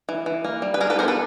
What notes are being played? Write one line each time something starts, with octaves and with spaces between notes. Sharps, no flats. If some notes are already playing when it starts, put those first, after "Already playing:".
E3
E3
A#3
G3
B4
G3 G#4 A#4
A4 B4
B3 A#4 C5
A4 B4